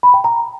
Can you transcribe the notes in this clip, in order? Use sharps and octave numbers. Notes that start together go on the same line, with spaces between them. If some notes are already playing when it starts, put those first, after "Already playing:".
B5
G5
A#5